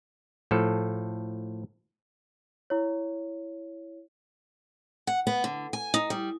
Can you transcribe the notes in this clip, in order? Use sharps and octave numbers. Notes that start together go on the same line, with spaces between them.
A2 F3 A4
E4 C#5
F#5
B3
D3
G#5
D#4
G3